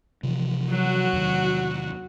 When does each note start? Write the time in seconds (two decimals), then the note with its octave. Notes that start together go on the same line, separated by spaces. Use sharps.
0.23 C3 E3 F3
0.70 F#3 F#4
1.13 E2 C3 D#3